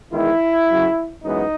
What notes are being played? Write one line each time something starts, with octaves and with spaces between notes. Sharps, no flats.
E2 D#3 G#3 E4
F#2 C#3 F#3
F#2 E3 G#3 B3 D#4